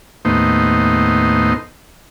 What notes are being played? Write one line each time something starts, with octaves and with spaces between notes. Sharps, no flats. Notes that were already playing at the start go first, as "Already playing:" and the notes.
D#2 A2 B3 D#4 C5